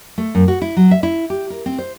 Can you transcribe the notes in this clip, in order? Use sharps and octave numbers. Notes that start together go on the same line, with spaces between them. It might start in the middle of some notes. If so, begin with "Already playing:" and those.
A3
F#2
F#4
E4
F#3
E5
E4
G4
A#4
C4
C5